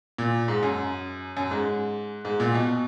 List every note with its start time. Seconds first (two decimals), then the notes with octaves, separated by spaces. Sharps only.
0.18 A#2
0.48 G#2
0.63 F#2
1.37 F#2
1.51 G#2
2.25 G#2
2.40 A#2
2.55 B2